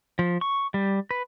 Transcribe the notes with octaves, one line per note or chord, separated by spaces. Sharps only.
F3
C#6
G3
B4